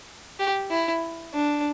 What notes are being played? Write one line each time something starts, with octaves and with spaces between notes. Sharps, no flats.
G4
E4
D4